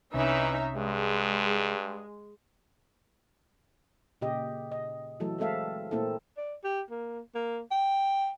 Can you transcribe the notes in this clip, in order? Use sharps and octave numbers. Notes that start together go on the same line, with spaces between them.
C2 C3 E3 C#4 D#4 E5
G2 G#3
A#2 C#3 G4 D#5
D#5
E3 F#3 A3 A4
G#3 A3 C4 A4 E5 F5
A#2 A3 A#3 C4 E4 A4
D5
G4
A#3
A#3
G5